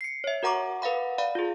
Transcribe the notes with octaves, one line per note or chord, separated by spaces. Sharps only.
C7 C#7
C#5 E5
F#4 A#4 F#5 A#5 C#6 D6
A#4 B4 F5 F#5 B5
D5 F5 B5
F4 G#4